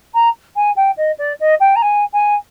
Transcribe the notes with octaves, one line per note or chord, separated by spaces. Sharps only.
A#5
G#5
G5
D#5
D5
D#5
G5
A#5
G#5
G#5